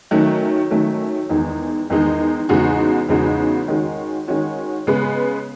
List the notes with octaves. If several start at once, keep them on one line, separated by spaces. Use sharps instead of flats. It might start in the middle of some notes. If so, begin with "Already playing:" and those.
D#3 F#3 A3 C#4
D#3 F#3 A3 C#4
E2 D#3 G#3 D#4
E2 D#3 G#3 D#4
E2 C#3 G#3 D#4 F#4
E2 C#3 G#3 D#4 F#4
D#3 G#3 C#4 F#4
D#3 G#3 C#4 F#4
C#3 G#3 B3